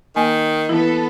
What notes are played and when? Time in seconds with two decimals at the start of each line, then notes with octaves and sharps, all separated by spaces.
0.16 D#3 A#3 G#5
0.69 E3 B3 E4 A4 B4